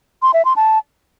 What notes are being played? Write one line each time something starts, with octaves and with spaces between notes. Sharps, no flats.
C6
E5
C6
A5